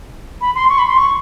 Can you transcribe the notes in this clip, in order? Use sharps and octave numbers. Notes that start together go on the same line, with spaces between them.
B5
C6
C#6
B5
C6
C#6